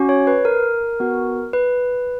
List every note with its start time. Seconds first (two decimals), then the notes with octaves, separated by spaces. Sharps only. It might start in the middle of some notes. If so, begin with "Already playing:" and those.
Already playing: C#4 F#4
0.09 C#5
0.27 B4
0.45 A#4
1.00 B3 F#4
1.53 B4